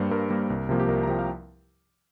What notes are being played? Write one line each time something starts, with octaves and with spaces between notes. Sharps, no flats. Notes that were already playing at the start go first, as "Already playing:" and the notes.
Already playing: G2 G3 A#3 C5
G2 A#4
G3 A#3
C2
C3 F3 A#3
G4
C2 A#4
A#5
C3 F3 A#3 G5
F5